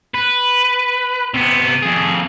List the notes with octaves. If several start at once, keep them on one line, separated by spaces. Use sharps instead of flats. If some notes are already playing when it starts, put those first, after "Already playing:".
B4
C3 B3
F2 G#4